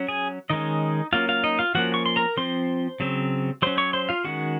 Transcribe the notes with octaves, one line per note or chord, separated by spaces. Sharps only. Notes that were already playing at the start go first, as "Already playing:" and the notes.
Already playing: F#3 C#4
G#4 G#5
D#3 G#3 C#4 D#4 D#5
F#3 A#3 C#4 F4 F5
F4 F5
D#4 D#5
F4 F5
F3 A#3 C#4 F#4 F#5
C#6
C6
A#4 A#5
F3 C4 C5 C6
C#3 F#3 C4
F#3 C#4 C5 C6
C#5 C#6
C5 C6
F4 F5
D#3 G#3 C#4 F#4 F#5